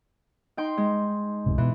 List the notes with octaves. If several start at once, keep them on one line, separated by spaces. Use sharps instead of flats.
D#4 G5 C6
G#3
C2 F#2 C3
B2 E3 A3 B3